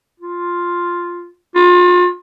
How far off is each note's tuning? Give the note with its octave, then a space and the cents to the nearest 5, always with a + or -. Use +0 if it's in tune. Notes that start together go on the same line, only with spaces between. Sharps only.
F4 +0
F4 +35